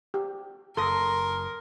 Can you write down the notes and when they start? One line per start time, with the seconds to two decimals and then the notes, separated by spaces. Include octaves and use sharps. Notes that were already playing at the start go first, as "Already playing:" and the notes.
0.14 G4
0.77 F#1 A4 A#4 C6 D#6 A#6